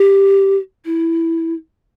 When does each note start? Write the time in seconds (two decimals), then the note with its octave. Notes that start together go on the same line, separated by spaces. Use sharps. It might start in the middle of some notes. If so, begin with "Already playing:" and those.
Already playing: G4
0.85 E4